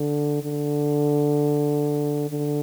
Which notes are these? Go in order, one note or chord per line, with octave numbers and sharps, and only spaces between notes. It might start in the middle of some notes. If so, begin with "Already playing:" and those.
Already playing: D3
D3
D3